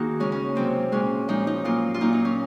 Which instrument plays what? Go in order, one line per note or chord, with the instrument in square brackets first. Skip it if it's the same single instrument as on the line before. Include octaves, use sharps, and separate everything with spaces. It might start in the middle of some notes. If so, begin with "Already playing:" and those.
Already playing: [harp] D#3 A#3 D#4 F#4 G#4
C#3 G#3 C#4
C#4
C3 F#3 A#3 C4
A#2 G#3 C#4
A#2 F3 G#3 D#4
D#4
A#2 F#3 A#3 F4
F4
A#2 F#3 A#3 D#4
D#4
C#4